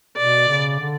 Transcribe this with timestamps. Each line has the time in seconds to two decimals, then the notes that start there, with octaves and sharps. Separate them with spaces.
0.17 B2 D5
0.48 C#3
0.80 D3